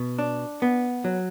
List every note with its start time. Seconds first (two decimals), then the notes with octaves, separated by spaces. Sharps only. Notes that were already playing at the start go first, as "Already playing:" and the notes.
Already playing: B2
0.19 D4
0.62 B3
1.04 F#3